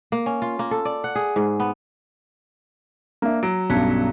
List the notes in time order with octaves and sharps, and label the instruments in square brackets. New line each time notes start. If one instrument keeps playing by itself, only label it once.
[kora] A#3
C#4
F4
A#3
A4
D5
F#5
G#4
G#2
B3
[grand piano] A#3 D4 E5
[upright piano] F#3 [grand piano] D7
[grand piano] B1 G2 [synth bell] B3 C#4 A5